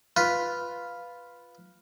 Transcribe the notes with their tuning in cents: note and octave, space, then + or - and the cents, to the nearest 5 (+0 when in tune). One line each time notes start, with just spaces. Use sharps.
F4 +0 B4 +0